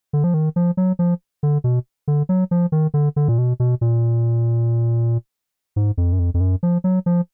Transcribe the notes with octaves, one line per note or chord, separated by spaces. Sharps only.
D3
F3
D#3
F3
F#3
F3
D3
B2
D3
F#3
F3
D#3
D3
D3
A#2
B2
B2
A#2
G#2
F2
F#2
F2
F2
F#2
F3
F#3
F3